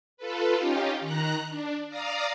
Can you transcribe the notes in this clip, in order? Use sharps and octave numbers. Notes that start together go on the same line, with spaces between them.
F4 A4 B4
C#4 D#4 F4 G4
D#3 A#5 F#6
D4
D5 F5 A#5 D#6